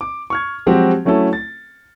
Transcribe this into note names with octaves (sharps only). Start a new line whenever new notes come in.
D6
C#6 F6 G#6
F3 F#3 G#3 C4 F#4 G4
F#3 A3 C#4 E4 A4
A6